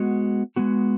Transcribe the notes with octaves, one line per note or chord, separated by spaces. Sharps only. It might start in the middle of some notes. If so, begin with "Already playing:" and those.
Already playing: G#3 B3 F#4
G#3 B3 F#4